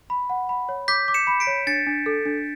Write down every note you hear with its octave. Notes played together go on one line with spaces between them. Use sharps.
B5
F#5
B5
C#5
D6 G6 B6
D6
C#7 E7
B5
B6 D7
C#5
D4 A6 C#7
D4
A4
D4